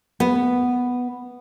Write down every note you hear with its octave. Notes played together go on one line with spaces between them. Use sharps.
B3